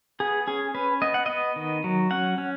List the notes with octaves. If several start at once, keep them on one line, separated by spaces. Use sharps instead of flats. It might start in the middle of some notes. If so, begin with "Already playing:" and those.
B3 G#4
C#4 G#4
C#4 B4
B3 D#5
F#5
B3 D#5
D#3
F#3
C#4 F#5
C#4